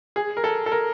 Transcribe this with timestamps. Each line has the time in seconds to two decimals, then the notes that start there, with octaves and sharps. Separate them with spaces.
0.16 G#4
0.37 A#4
0.44 A4
0.66 A4
0.72 A#4